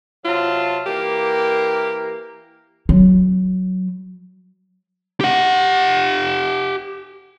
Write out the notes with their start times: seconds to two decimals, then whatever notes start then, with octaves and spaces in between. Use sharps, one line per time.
0.25 C3 F#3 F4 A5
0.86 E3 A#3 G4
2.89 F#3
5.20 G4 F#5